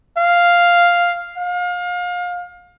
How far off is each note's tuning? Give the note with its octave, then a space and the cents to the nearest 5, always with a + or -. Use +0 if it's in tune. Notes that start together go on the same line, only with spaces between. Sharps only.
F5 +0
F5 +30